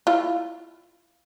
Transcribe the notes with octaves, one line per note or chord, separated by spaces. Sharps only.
E4 F4